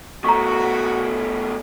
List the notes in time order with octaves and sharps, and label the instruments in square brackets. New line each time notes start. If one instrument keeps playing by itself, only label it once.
[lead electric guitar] B2 A3 [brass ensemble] F#4 [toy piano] A#5 C#6